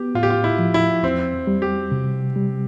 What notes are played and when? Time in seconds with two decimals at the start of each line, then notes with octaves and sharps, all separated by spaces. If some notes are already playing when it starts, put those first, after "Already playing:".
Already playing: B3 G4
0.15 A2 F4
0.23 G4
0.30 F4
0.44 E4
0.59 F3
0.74 E4
1.03 E2 C4
1.47 G3
1.62 G4
1.92 C3
2.36 G3